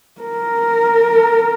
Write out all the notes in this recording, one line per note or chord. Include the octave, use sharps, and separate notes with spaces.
A#4